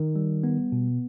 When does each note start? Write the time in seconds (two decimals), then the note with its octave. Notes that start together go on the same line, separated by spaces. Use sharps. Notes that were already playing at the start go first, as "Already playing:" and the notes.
Already playing: D#3
0.16 G3
0.44 B3
0.72 B2